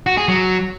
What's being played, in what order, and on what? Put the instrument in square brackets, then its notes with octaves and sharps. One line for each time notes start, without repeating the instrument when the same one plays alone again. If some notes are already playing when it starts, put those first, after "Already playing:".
[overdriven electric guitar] F#4
G#4
F#3